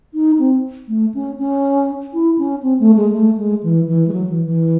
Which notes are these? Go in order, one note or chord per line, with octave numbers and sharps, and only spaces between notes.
D#4
C4
A3
C#4
C#4
E4
C#4
C4
A3
G#3
A3
G#3
E3
E3
G#3
F#3
E3
E3